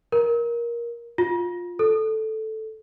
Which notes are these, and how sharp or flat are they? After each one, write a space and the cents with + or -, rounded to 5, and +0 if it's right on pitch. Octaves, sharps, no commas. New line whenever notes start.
A#4 +15
F4 +15
A4 -5